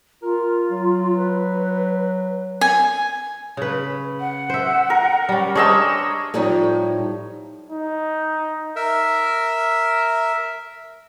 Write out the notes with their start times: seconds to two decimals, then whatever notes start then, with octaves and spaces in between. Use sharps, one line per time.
0.22 F4 A#4
0.71 F#3
1.17 B4
2.61 G#5
3.57 C#3 B4
4.19 F#5
4.50 C5 E5
4.90 A#4
5.29 G3 C#4
5.55 D4 G#4 C5 C#5 D#5 E6
6.34 A2 F3 G3 D#4 C#5
7.70 D#4
8.76 A#4 E5